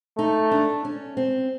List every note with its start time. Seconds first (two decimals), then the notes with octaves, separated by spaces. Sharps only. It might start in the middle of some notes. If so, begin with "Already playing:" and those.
0.18 A3 D#4
0.51 D4
0.85 C#4
1.17 C4